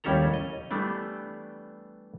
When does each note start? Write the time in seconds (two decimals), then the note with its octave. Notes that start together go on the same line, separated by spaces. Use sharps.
0.04 D#2 G3 C#4 E4 A4 A#5
0.34 D#5
0.71 E3 G3 A3 B3 D4